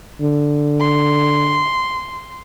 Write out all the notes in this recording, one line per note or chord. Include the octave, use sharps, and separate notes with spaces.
D3
C6